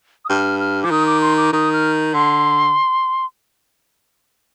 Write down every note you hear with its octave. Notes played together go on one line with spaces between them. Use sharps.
D#6
G2 F6
F6
F3 D6
D#3 D#6
D6
C6
D6
D#3 D#6
F6
D3 C6